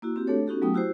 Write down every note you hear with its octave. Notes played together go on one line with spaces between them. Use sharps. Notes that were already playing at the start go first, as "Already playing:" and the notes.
A#3 E4 F#4
C4 F#4 G4
A3 D4 A4 C#5
B3 C#4 D#4 F#4 G4 A4
F#3 A3 B3 G5 D#6
E4 F#4 G4 C5